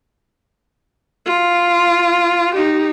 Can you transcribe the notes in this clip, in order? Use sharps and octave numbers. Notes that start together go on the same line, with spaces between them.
F4
D#4 G4